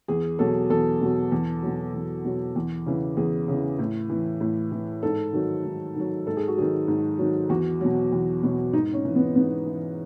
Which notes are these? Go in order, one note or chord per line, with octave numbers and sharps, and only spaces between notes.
E2 G#4
B2 F#3 A4
E2 A4
B2 F#3
E2
B2 F#3
E2
B2 F#3
E2
C#3 E3
E2 G#4
C#3 E3
A2
E3
A2
E3
G#2 A4
D#3 F#3
G#2
D#3 F#3
G#2 A4
G#4
F#4
D#3 F#3 G#4
G#2
D#3 F#3
E2 F#4
B2 F#3
E2
B2 F#3
G#2 D#4
C#4
E3
B3
G#2 B3
E3